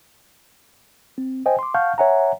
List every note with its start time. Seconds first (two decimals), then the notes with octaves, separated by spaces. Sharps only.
1.18 C4
1.46 C5 D#5 G5 G#5
1.59 C6 D6
1.74 F5 F#5 A5 C#6 F6 G6
1.98 C#5 E5 F#5 G#5 A#5